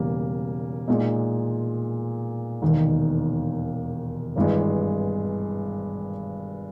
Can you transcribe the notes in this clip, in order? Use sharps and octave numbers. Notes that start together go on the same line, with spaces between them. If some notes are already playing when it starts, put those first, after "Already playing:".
Already playing: E1 E2 C#3 G3 A#3
A#2 G#3 D#4
E1 D#2 D#3
G#1 G2 E3 G#3